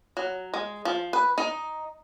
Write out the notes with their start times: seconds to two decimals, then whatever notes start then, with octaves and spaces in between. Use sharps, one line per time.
0.17 F#3
0.54 G#3
0.85 F3
1.13 B4
1.38 D#4